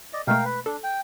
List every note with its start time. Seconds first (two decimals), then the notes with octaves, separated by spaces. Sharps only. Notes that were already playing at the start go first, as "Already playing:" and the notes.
0.13 D5 D#5
0.27 B2 G#3 A3 A#4 F5 G5
0.45 B4
0.66 D4 A4
0.84 G5